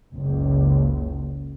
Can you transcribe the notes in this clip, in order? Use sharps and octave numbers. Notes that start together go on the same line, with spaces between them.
F#1 C#2